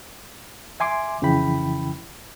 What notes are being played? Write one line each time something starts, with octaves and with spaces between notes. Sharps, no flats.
E5 G#5 C6 D6
F2 C#3 E3 E4 G5 B5